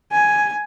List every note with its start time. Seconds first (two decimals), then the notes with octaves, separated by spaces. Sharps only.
0.12 G#5